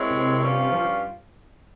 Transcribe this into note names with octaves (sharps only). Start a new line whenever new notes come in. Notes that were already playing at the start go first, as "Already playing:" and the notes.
Already playing: G#3 C4 E4 A#4 C#5
C3
G2 G3 C#4 F4
F3